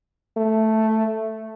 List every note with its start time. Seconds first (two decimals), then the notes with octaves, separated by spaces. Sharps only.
0.37 A3